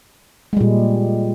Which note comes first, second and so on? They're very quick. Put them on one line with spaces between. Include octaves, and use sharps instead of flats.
G#3 G3 A#2